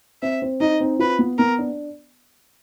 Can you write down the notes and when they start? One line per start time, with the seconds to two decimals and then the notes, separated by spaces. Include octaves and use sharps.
0.22 C4 E5
0.42 C4
0.60 D#4 D#5
0.81 C4
0.99 F4 B4
1.19 B3
1.38 B3 A#4
1.59 D4